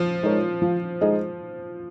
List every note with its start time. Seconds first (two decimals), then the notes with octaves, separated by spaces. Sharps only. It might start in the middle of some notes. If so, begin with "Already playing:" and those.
Already playing: F3
0.23 G#3 D#4 A#4 C#5
0.62 F3
1.01 G#3 D#4 G#4 D#5